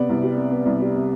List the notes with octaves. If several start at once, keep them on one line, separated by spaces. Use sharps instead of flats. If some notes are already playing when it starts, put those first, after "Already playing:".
Already playing: C3 B3 B4 D5
C2
G3
C3
B3
C2
G3
C3